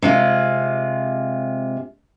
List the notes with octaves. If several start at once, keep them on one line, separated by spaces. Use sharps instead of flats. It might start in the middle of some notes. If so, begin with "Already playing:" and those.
C3 G#3 F4